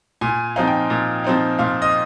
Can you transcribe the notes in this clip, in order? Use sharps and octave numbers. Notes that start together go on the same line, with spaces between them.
A#2 G#5
F3 C4 D#4 F5
G5
A#2
F3 C4 D#4
A#2 F5
D#5